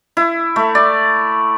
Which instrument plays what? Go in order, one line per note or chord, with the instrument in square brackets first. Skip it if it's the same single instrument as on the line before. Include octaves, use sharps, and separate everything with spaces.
[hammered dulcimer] E4
A3
D5